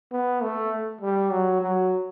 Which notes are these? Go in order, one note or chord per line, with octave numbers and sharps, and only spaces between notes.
B3
A3
G3
F#3
F#3